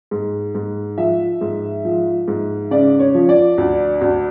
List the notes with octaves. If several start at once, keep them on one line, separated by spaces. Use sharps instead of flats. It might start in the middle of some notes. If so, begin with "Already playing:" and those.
G#2
G#2
F3 E5
G#2
F3
G#2
C#3 D5
C#5
F3
D5
D2
D2